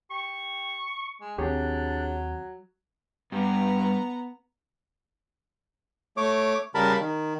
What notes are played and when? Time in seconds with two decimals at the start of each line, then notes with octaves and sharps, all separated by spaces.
0.11 G4 C#6
1.21 G#3
1.38 D#2 F#3 C4 D4 G4 G#4 C#5
3.32 G2 B3 A#5
6.17 A3 C#5 D6
6.75 C#3 G3 A#4 A5 B5
7.00 D#3